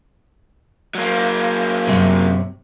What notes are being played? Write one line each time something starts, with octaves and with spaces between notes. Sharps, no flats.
F#3 A#3
F#2 C3 C4